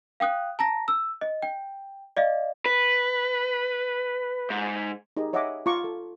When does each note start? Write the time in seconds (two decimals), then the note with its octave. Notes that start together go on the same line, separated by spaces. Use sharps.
0.20 F5 G5 D#6 F#6
0.59 A5 A#5 A#6
0.88 E6
1.21 D#5
1.42 G5
2.17 D5 D#5 F5
2.66 B4
4.50 G#2
5.17 D#4 G4 G#4 A#4 D#5
5.33 C#5 D#5 E5 F#5 G#5 D6
5.66 F4 A#5 C#6 D6
5.84 A4